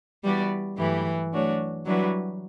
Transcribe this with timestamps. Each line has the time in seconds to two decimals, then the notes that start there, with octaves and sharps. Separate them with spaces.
0.24 E3 G3 B3 F#4 B4 D5
0.78 G2 E3 F#3 A3 E4 G4
1.32 F#3 A3 D4 F#4 C#5
1.86 E3 F#3 G3 D4 F#4 B4